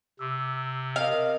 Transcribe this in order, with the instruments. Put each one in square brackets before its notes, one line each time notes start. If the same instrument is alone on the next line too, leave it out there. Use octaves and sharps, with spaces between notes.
[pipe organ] C3 [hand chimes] C6 D6 E6
[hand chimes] C4 A#4 [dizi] D#5 [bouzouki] F5